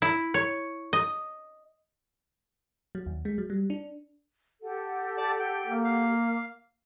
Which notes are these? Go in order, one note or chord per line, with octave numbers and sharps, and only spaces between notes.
E4
C#5
D#5
F#3
D#2
G#3
F#3
G3
D4
G4 A4 F#5
D5 A5
G5
A#3
F5